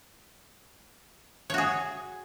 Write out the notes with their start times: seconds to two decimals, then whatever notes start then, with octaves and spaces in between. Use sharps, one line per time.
1.50 C#5
1.54 F#4
1.58 G#4